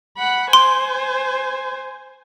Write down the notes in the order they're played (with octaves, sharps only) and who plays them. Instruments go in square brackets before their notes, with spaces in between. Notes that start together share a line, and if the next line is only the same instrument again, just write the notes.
[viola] F#5 B5
[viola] C5 G#5 [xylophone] C6